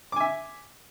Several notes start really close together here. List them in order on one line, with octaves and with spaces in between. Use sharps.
D6 G#5 E5